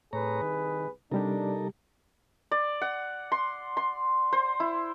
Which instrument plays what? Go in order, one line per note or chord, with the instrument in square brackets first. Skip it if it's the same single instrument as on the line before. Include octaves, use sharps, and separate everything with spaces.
[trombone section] C2 G#4 B4 [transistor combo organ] A2 C#5 A#5
[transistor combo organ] D#3
[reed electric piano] C3 G3 G4 [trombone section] D4 [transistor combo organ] D#4 A4 A#4
[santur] D5
F#5
C6
C6
C5
E4